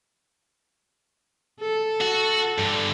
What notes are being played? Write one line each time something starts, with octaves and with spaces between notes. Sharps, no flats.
A4
F#4
G2 D3